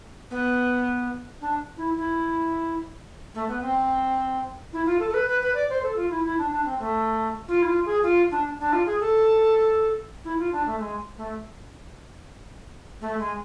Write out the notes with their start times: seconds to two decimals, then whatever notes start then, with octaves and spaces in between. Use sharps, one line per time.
0.31 B3
1.41 D4
1.77 E4
1.97 E4
3.34 A3
3.48 B3
3.62 C4
4.73 E4
4.86 F4
5.00 A4
5.10 A4
5.14 B4
5.27 B4
5.41 B4
5.55 D5
5.70 C5
5.83 A4
5.96 F4
6.10 E4
6.25 E4
6.38 D4
6.52 D4
6.65 C4
6.79 A3
7.48 F4
7.62 E4
7.67 F4
7.85 G#4
8.03 F4
8.31 D4
8.59 D4
8.73 F4
8.86 G#4
9.00 A4
10.24 E4
10.39 F4
10.52 D4
10.66 A3
10.80 G#3
11.17 A3
13.01 A3
13.19 G#3